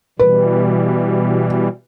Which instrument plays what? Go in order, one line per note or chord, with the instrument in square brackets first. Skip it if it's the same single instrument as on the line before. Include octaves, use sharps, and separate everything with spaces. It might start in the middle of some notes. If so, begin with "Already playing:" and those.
[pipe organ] B2 E3 G3 [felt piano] B4